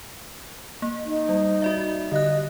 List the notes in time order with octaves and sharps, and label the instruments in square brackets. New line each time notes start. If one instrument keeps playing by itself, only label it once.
[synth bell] A#3
[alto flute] D#4
[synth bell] G3
F#4 D5 E5
[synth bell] D3 F#6 [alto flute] D#5